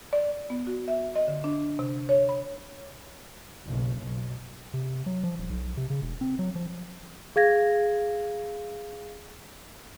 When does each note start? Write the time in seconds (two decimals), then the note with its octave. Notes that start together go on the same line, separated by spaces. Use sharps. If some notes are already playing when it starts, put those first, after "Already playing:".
0.13 D5
0.50 B3
0.67 F#4
0.88 E5
1.15 D#5
1.28 D3
1.44 D4
1.79 C3
2.09 C#5
2.29 B5
3.65 F#1 B1
3.97 B1
4.74 C3
5.06 F#3
5.24 F3
5.38 D#1
5.50 B1
5.77 C3
5.90 C#3
6.02 E1
6.21 C4
6.39 F#3
6.55 F3
7.36 G#4 F5 G#6 A#6